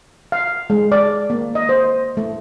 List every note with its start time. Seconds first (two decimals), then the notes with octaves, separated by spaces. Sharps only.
0.32 F5
0.70 G#3
0.92 D5
1.30 A#3
1.55 D#5
1.69 C5
2.17 A3